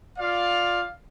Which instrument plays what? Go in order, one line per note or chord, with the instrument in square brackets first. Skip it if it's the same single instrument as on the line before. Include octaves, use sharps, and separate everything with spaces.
[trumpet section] F4 D5 F5